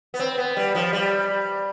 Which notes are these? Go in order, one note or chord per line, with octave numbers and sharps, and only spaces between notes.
B3
C4
B3
G3
F3
G3